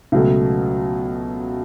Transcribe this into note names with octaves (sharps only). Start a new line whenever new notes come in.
C#2 B2 F#3 A3